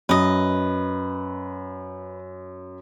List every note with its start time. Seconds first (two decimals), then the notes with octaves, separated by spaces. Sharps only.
0.09 F#2 B4 D#5